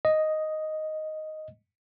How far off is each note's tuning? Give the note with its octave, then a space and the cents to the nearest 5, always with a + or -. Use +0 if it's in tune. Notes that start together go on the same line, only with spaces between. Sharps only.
D#5 +0